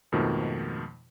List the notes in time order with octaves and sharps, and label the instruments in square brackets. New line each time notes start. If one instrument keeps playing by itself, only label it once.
[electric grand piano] F2 G#2 B2 D#3 F3 A3